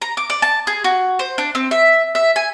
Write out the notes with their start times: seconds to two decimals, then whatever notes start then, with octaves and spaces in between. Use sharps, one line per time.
0.02 A#5
0.17 D6
0.30 D5
0.42 A5
0.67 G#4
0.84 F#4
1.19 C5
1.38 D4
1.55 C4
1.71 E5
2.15 E5
2.36 G#5